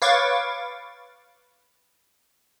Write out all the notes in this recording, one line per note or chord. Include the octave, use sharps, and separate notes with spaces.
B4 C#5 F5 C#6 D6 A6